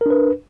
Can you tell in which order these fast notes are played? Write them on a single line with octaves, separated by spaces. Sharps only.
A#4 D4 B4